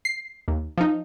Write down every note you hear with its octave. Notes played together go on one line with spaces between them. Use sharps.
C7
D#2
F3 D#4